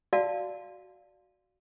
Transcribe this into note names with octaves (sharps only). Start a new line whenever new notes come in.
F#4 D5 F5 A5